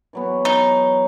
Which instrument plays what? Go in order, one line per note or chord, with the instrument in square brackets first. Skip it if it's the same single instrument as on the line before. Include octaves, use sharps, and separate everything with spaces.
[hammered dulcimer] E3 F#3 B3
[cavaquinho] D#4